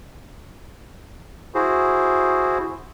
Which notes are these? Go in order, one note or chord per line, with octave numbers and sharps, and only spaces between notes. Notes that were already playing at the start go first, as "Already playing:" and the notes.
E4 F#4 G#4 C5